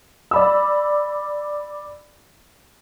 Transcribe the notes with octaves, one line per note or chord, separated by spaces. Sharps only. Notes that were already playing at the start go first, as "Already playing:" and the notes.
D5 B5 E6